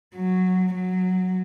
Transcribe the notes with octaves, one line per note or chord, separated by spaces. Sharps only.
F#3
F#3